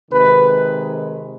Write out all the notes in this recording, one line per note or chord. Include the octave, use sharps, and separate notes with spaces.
C3 D#3 G#3 B4